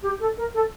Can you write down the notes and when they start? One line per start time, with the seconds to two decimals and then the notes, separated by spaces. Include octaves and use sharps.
0.02 G4
0.20 A4
0.37 A#4
0.54 A4